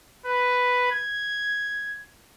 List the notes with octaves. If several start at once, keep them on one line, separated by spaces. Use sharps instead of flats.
B4
G#6